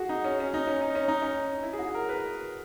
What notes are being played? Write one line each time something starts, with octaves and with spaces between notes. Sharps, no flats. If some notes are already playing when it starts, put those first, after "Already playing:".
Already playing: F#4 G#4
D#4
C#4
C#4
D#4
C#4
D#4
C#4
D#4
C#4
E4
G#4
F#4
G#4
A#4
B4